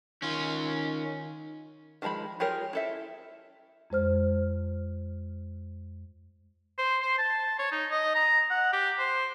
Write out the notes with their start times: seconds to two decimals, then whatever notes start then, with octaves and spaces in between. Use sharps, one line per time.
0.22 D#3 C#4 F4
2.02 D#3 F3 G#3 A#5 B5
2.40 F4 G4 G#4 A#4 C#5
2.73 E4 A4 E5
3.90 F2 G#3 C5 F6
6.78 C5
7.01 C5
7.18 A5
7.59 C#5
7.72 D#4
7.91 D#5
8.15 A#5
8.50 F#5
8.73 G4
8.99 C5